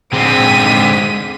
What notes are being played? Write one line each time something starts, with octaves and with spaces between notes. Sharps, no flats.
G#2 D3 C4 B6 D#7